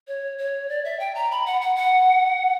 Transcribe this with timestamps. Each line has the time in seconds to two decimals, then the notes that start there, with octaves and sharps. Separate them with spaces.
0.08 C#5
0.38 C#5
0.69 D5
0.84 E5
1.00 G5
1.15 A#5
1.31 B5
1.46 F#5
1.61 F#5
1.76 F#5